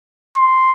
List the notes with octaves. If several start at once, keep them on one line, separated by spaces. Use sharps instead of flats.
C6